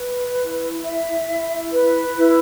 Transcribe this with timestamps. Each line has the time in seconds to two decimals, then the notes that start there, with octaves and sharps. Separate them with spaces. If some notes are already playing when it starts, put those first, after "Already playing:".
Already playing: B4
0.39 E4
0.84 E5
1.28 E4
1.72 B4
2.16 E4